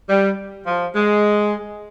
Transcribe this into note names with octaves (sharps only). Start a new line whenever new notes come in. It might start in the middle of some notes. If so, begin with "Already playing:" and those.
G3
F3
G#3